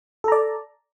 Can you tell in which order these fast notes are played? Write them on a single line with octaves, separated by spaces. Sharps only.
A4 A#5 D5